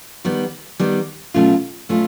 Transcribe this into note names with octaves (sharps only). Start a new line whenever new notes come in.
D#3 G3 B3
D#3 G3 B3
B2 F#3 A3 C#4 F4
B2 F#3 A3 C#4 F4